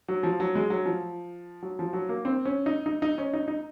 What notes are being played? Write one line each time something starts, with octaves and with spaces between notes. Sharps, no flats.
F#3
F3
F#3
G#3
F#3
F3
F#3
F3
F#3
A#3
C4
C#4
D#4
D#4
D#4
C#4
D#4
D#4